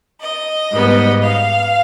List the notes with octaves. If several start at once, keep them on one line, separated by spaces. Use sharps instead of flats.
D#5
G#2 G3 B3
F5